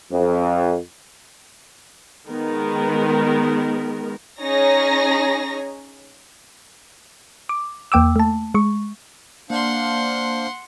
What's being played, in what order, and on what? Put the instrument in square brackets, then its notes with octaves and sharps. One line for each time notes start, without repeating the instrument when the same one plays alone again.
[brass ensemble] F2
[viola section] D#3 G#3 B3 A#4
[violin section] C#4 D#4 G#4 C#5 A#5 A#6
[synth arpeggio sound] D6
E2 A#3 G5 D6 E6
A3 A5
G#3 C#6
[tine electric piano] A#3 [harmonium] D4 C5 F5 [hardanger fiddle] F#5 C6